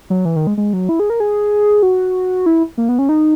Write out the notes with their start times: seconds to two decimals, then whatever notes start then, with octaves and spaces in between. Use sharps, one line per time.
0.10 F#3
0.25 E3
0.36 D#3
0.47 G#3
0.57 G#3
0.73 F#3
0.89 E4
1.00 G#4
1.10 A#4
1.20 G#4
1.83 F#4
2.46 E4
2.78 A#3
2.89 B3
2.99 C#4
3.09 D#4